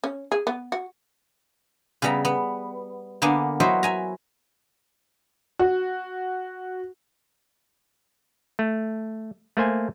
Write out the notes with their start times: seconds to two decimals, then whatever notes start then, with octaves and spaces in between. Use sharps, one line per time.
0.04 C#4
0.32 G#4
0.47 B3
0.72 F#4
2.02 C#3 G3 B3 E5 A#5
2.25 B3
3.22 D3 A#3 B3 D4 G#5
3.60 F#3 E4 F#4 C5 D#5 E5
3.83 E5 G#5 A#5
5.59 F#4
8.59 A3
9.57 A3 A#3 C5 G#5